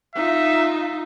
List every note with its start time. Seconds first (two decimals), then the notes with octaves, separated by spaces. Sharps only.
0.15 D#4 F4 E5